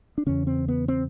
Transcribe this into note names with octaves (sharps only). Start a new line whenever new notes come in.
D4
E2 C#3 C#4
C4
B3
C4